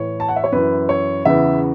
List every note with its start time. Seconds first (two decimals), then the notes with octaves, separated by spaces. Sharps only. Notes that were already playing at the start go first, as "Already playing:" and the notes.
Already playing: A2 E3 C#5
0.20 A5
0.28 F#5
0.36 E5
0.44 C#5
0.52 F#2 E3 B4
0.89 C#5
1.25 E2 C#3 E3 E5